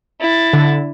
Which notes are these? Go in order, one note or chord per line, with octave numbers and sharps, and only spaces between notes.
E4 A6
D3